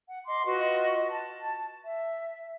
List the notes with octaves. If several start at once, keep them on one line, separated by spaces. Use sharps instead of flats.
F#5
D#5 C6 D6
F4 F#4 B4 D#5
A5
E5